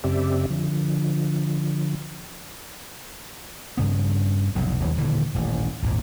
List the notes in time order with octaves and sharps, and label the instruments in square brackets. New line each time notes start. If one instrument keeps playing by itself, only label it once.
[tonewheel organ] F#2 C#3 C4 G4 D5 E5
D3 F3
[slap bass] G2 C#3 B3
F1 B1 A2
E1 D#2 E3 F#3
D#1 D3 E3
D#1 A1
G#1 D#2 A#2